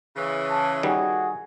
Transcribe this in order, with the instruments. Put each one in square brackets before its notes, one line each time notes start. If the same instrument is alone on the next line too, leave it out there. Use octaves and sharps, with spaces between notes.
[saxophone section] C#3 E3
[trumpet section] A5
[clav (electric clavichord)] D#3 G3 [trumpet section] F#4 G#4